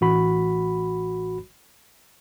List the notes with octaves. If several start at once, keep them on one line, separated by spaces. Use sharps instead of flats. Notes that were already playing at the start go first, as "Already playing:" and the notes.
A1 F#4 B5